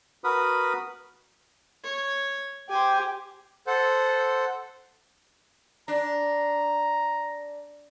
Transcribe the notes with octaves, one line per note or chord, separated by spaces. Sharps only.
F#4 A#4 B4 B5 D#6
C#5
G4 C5 G#5
A4 C5 F#5
D4 A#5